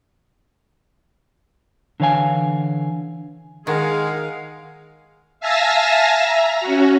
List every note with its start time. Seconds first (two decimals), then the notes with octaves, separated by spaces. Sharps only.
2.00 D3 E3 C#5 F5 G#5
3.67 D#3 G#3 G#4 A#4 F5 F#5
5.40 E5 F5 G#5 A5 E6 A#6
6.20 E5 A#5
6.61 C#4 F#4